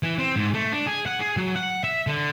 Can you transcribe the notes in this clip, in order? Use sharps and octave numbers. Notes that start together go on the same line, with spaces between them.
E3
C4
G#2
A3
D4
G#4
F#5
G#4
F#3
F#5
E5
D3